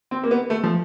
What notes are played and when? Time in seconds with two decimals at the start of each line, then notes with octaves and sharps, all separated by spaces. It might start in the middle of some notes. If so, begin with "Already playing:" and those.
0.11 C4
0.24 A#3
0.31 B3
0.50 A3
0.64 F3